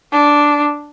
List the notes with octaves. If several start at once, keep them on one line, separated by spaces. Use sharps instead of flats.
D4